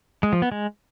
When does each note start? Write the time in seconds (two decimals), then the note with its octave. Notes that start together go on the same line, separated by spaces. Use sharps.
0.23 G#3
0.33 F3
0.42 B3
0.52 G#3